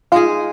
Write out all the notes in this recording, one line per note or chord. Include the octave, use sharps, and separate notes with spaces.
G#3 D#4 F4 G#4 F5